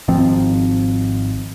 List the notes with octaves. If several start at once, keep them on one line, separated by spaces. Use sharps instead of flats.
G#1 D#3 F3 C4